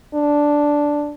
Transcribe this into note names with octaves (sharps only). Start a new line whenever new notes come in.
D4